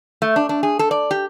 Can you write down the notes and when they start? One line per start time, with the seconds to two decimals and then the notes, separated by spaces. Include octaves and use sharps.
0.22 A3
0.36 D4
0.49 D4
0.63 G#4
0.79 A4
0.91 D5
1.11 G4